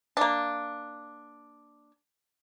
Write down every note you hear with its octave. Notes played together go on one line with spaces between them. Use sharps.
A#3 D4